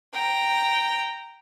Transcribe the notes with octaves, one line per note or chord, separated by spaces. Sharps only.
G5 A#5